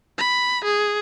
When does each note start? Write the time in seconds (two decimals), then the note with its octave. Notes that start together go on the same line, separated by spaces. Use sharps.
0.18 B5
0.64 G#4